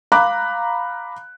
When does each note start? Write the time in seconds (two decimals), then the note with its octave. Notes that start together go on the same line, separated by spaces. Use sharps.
0.12 F5 A#5 B5 D6 F#6